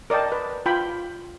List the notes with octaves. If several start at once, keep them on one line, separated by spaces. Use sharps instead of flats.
A#4 D5 D#5 G5 A5
B4
F4 G5 B5